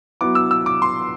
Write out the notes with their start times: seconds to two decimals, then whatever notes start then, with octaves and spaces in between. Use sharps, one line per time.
0.21 F#3 B3 E4 D6
0.35 E6
0.51 E6
0.66 D6
0.82 C6